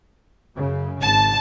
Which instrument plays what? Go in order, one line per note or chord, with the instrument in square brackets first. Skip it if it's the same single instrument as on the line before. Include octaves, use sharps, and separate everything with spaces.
[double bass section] F#2 C#3
[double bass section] G#1 [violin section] A5